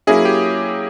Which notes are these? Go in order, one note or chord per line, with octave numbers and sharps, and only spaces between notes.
F#3 A#3 C#4 E4 G#4
G4